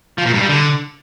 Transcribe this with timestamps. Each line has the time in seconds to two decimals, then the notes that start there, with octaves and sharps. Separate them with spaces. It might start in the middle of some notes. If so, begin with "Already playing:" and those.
0.18 F3
0.26 A#2
0.34 G2
0.41 G3
0.49 D3